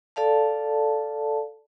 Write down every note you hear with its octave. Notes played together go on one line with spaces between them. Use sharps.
A4 D5 F5 A5